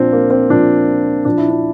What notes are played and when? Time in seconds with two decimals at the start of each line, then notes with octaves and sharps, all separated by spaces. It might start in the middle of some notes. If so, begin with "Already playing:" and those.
Already playing: A#2 F3 C4 D4
0.13 A#3
0.31 C4
0.49 A#2 F3 D4
1.25 A#2 F3 D4
1.38 E4
1.50 D4